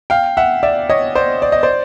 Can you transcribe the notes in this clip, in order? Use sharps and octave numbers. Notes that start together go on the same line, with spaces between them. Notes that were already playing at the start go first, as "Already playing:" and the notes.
F5 G5
E5 F#5
D5 E5
C#5 D#5
C5 D5
D5
D#5
C5 D5